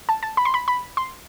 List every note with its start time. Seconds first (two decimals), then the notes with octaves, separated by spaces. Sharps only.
0.09 A5
0.23 A5
0.37 B5
0.45 C6
0.54 B5
0.68 B5
0.97 C6